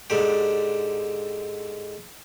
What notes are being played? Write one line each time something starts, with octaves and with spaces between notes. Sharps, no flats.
G#2 D3 G4